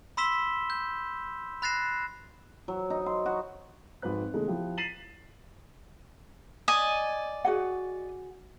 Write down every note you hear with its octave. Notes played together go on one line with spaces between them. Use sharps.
B5 C6 E6 B6 E7 G7
G6
B5 F#6 A6 A#6 C7 E7
F#3
D#4
C6
F#4
G#1 F2 G#2 B4 F#6
C#3 E3 G#3 A3 B3
F3 E4 G4
A6 B6 C7 D#7 E7 F#7
D5 D#5 G#5
F#4 G#4 F#5